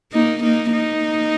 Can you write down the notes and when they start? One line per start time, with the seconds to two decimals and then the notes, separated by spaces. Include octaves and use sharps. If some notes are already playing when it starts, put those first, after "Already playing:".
0.13 A#3 D#4
0.43 A#3 D#4
0.73 A#3 D#4